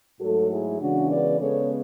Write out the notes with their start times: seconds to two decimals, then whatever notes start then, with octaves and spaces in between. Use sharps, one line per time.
0.20 G#2 F#3 A3 F#4 A4
0.50 E4 G#4
0.80 C#3 E3 G#3 B3 D4 F#4
1.10 B4 D5
1.40 C#3 G#3 B3 A4 C#5